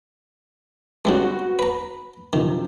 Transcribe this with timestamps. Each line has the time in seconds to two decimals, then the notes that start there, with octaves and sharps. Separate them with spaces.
1.05 C#3 G3 G#3 B3 C4 F#4
1.59 B4 A#5 B5
2.33 F#2 C3 D#3 F3